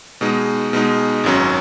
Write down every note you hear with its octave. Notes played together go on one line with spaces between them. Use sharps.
B2 G#3 D#4
B2 G#3 D#4
G#1 F#2 F#3 C#4